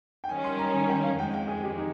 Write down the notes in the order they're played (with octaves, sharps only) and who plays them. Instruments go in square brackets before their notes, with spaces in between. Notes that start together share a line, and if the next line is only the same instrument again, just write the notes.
[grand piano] G5
[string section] D#3 G3 C#4 [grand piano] G#5
[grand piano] C6
A#5
G#5
G5
F5
[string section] F2 D#3 G#3 [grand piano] G5
[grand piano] G5
G#4
G4
D#4